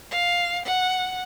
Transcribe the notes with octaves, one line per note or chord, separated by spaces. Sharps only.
F5
F#5